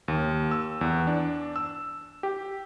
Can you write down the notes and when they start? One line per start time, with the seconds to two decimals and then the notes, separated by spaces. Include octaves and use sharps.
0.08 D#2
0.51 E6
0.81 E2
1.07 D4
1.56 E6
2.23 G4